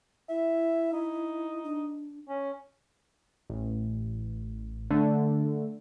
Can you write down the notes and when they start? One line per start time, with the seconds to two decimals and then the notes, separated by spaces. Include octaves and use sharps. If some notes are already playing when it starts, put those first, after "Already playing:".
0.29 E4 E5
0.93 D#4
1.64 D4
2.29 C#4
3.50 A1
4.91 D3 A3